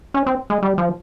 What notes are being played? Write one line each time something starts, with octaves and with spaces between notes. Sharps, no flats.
C#4
C4
G#3
G3
F3